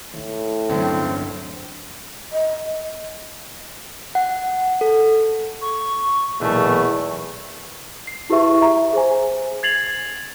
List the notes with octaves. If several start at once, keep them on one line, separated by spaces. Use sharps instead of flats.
A2 D#3 E4
D1 G2 D3 F#3 C4 C#4
D#5
F#5
A4
C#6
B1 E2 A#2 A3 C#6
C7
E4 G4 G#4 B4 E5 C#6
E5 A#5
G#4 C5 G#5
G#6 A6 C7 F7 F#7